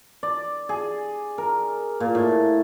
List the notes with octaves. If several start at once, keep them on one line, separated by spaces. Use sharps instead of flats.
D5
G#4
A#4
A#2
A2